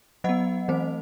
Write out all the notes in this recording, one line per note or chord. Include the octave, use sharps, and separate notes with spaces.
F#3 B3 D#5 F#5
E3 A3 C4 C5